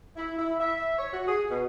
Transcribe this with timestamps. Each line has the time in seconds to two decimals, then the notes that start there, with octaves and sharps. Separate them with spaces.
0.17 E4
0.39 E4
0.60 E5
0.98 C#5
1.13 F#4
1.27 G#4
1.50 B2